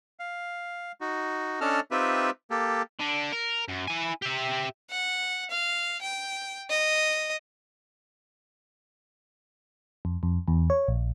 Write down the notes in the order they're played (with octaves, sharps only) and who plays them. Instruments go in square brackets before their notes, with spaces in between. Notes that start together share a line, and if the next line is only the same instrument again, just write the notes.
[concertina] F5
D#4 F#4
C#4 D4 A4 D#5 A5 F6
C4 D#4 F4 G4 B4 E5
A#3 G4 A4
[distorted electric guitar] D3 D4
A#4
F#2
E4 G#5
G4 E5
[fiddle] F#5
F5
G5
D#5
[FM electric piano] F2
F2
E2
C#5
A#1